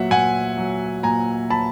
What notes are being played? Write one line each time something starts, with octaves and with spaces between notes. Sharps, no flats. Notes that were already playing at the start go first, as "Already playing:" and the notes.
Already playing: A#2 F#3 E5 F#5
A#2 F#5 G#5
F#3
A#2 G#5 A#5
F#3 A5 B5